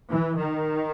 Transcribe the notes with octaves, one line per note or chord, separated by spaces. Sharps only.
E3
D#3